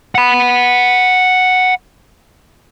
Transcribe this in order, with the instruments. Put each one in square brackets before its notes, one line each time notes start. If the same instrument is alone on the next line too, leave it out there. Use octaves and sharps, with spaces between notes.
[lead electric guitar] F#5 B5